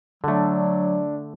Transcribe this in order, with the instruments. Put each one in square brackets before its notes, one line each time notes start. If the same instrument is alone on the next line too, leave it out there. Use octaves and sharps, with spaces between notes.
[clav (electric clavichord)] D3 A3 [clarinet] F#3 [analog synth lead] D4